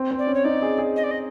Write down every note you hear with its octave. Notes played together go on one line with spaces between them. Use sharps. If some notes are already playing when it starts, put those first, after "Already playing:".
Already playing: C4
C4
D5
C#4
C#5
D#4 D5
G#4
G#4
D#5
D5
D#5